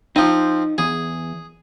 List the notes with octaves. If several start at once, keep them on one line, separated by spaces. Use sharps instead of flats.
F3 C4 D#4
E2 G#4